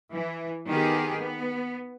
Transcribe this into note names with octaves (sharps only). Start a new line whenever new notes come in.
E3
D#3 B3 G4 G#4
B3